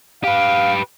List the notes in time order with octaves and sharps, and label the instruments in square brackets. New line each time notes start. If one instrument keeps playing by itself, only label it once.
[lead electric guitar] G4 B4 [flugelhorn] F5